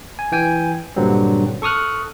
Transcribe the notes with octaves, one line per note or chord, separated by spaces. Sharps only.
G#5
E3 G5 G#5
G2 A#2 D3 F#3 G3 C4
A4 C#6 D#6 F6 F#6